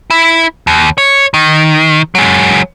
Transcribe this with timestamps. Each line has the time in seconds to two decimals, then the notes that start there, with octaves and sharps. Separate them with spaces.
0.10 E4
0.67 D#2
0.98 C#5
1.34 D#3
2.15 F#3 G#3